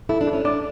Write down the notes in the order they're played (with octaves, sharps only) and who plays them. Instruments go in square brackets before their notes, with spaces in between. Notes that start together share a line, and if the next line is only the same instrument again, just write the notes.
[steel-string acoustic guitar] E4 [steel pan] A4
[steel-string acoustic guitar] D4
[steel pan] A4
[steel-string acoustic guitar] C#4
[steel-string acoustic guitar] D4 [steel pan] D5